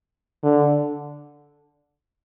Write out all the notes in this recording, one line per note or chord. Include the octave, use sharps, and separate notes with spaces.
D3